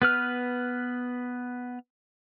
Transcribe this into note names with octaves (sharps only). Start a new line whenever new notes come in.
B3 B4 F6